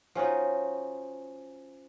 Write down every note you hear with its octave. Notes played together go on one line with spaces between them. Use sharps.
F3 C#4 D#4 F#4